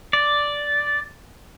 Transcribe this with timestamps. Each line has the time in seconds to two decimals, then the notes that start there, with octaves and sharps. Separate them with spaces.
0.13 D5